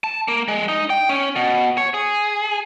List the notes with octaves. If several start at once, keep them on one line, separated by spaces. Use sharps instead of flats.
A5
A#3
G#3
D#4
G5
C#4
B2
C#5
G#4